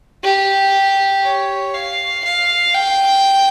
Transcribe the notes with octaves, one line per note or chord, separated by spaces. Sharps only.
G4
C#5
F5
F5
G5